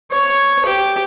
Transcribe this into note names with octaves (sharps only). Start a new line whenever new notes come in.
C#5
G4